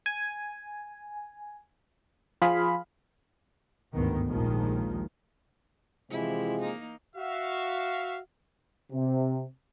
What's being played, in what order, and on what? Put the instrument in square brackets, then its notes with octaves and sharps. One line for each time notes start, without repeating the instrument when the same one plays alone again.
[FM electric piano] G#5
F3 F4 G#4 F5 B5
[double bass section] G1 D2 G#2 B2 D#3 B3
A#1 D#2 D#3 F3 G#3
[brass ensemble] C3 F3 G#3 [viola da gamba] E3 E4
[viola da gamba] A#3 D#4
[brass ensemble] F#4 E5 F5
C3